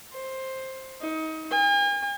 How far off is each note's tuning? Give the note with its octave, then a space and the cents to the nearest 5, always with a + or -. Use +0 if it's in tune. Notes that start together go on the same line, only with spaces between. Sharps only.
C5 +10
D#4 +30
G#5 -45